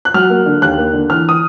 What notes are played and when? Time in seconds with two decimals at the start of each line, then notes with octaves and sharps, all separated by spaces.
0.05 F#6
0.14 F#3 F6
0.30 A#3
0.46 D3
0.62 D#2 F#6
0.78 A#3
0.93 D3
1.10 E3 F6
1.29 D#6